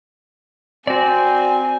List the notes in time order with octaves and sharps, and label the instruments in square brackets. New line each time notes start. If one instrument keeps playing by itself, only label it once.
[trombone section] C4 [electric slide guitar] F#4 D5 [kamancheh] G#5